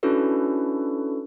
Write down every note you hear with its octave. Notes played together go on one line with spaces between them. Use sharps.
C#4 D4 E4 F#4 A4 B4